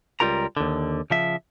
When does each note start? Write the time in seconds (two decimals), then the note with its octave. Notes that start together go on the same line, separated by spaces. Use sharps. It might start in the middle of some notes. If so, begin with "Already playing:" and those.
0.20 C#2 G3 F4 A#4 A#5
0.57 D#2 D3
1.10 C#3 F3 E5